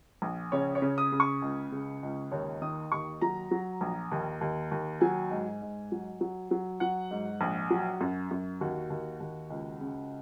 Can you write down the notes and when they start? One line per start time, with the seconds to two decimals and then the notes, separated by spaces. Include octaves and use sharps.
0.22 A#1
0.52 C#3 C#5
0.75 C#5
0.82 C#3
0.98 D#6
1.12 C#3
1.20 C#6
1.42 C#2
1.72 C#3
2.03 C#2
2.31 D#2 C#5
2.62 D#3 D#6
2.92 D#2 C#6
3.21 F#3 A#5
3.51 F#3
3.81 A#1
4.11 D#2
4.41 D#2
4.71 D#2
5.01 F#3 G#5
5.31 G#2
5.61 G#2
5.92 F#3
6.21 F#3
6.51 F#3
6.80 F#3 F#5
7.11 G#2
7.41 A#1
7.70 F#3
8.01 F#2
8.31 F#2
8.61 D#2 F#4
8.90 D#2
9.20 D#2
9.50 C#2
9.80 C#3